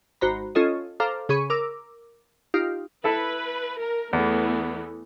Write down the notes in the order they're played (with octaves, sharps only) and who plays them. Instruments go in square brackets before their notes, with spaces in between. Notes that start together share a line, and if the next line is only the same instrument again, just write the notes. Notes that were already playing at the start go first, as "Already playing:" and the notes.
[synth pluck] G#1 F#4 C5 A#5 B5
C#4 F4 A4 C#5 D#5
A4 C5 F5 A#5 D6 F6
C#3 G#4 B5 C#6 D#7
A#4 D6 E6
D#4 F4 G4 F5
[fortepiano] E4 A4 E5 [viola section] B4
[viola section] A#4
[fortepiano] E2 [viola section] E3 A3 B3